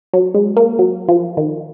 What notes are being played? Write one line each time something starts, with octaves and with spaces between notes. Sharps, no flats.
F#3
G#3
A#3
F#3
F3
D#3